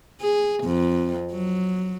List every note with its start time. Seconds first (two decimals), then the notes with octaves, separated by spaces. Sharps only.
0.21 G#4
0.64 F2
1.32 F#3